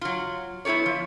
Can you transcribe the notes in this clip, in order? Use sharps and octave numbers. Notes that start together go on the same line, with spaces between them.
F#3 F4
B3 E4 G#4 A4 C#5
F3